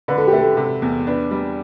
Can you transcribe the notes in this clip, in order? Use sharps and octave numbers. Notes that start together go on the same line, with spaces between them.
D3 B4
A4
G4
A3 A4
C3
E2
D4 B4
G3